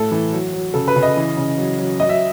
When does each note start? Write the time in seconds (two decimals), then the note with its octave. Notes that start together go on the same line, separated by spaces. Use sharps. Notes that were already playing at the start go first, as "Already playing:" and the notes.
Already playing: A2 A4
0.11 E3
0.33 F#3
0.53 F#3
0.74 C#3 A4
0.88 B4
0.96 C#3
1.02 D#5
1.17 E3
1.37 C#3
1.58 F#3
1.79 F#3
2.00 F#3 D#5
2.09 E5